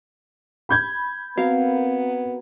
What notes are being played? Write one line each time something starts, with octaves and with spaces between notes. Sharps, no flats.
B5 G6 G#6
B3 C4 F#4 A#4 F5